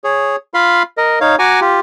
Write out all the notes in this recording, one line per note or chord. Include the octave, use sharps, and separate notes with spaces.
G#4 C#5
F4 F5 B5 C6
A#4 D#5
D#4 C#5 F5
F#4 G#5 A#5 C#6 D6
F4 G4